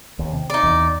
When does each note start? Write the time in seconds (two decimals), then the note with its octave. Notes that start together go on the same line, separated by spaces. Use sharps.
0.19 D#2
0.33 C3
0.50 D#4 D5
0.63 E2